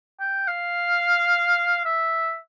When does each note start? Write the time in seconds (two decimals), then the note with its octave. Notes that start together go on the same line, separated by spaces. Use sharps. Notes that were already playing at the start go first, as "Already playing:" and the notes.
0.20 G5
0.47 F5
1.85 E5